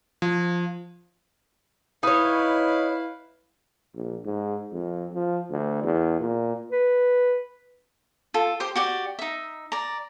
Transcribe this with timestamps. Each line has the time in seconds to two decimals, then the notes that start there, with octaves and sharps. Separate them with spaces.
0.22 F3
2.03 D#4 E4 B4 C#5 F5
3.95 A#1
4.26 G#2
4.72 F2
5.14 F3
5.51 D2
5.83 E2
6.20 A#2
6.71 B4
8.34 F4 A4
8.60 G4 C5 C6
8.76 F#4 G4 D5
9.19 D#4 E5
9.72 D5 A#5